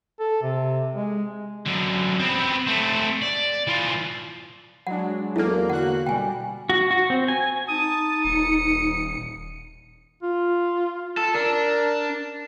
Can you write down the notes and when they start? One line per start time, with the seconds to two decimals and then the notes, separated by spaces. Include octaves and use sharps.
0.19 A4
0.42 C3
0.95 G#3
1.66 F#2 D3
2.19 B3 C4
2.67 A3 C4
3.22 D5
3.67 E3 F4
4.87 F#3 G#3 D4 F#5
5.36 E2 A#3 E4 A4
5.70 D3 F#4 F#5 F#6
6.06 B2 G3 G5 G#5
6.70 F#4
6.91 F#4
7.10 C4
7.28 G#5
7.69 D#4 A5 D#6
8.25 D#1 C#7
10.23 F4
11.17 A4
11.35 D4 A#4